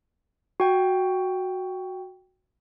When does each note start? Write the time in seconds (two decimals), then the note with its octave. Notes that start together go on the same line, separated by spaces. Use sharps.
0.60 F#4 G5